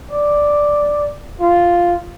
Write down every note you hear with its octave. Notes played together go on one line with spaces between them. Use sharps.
D5
F4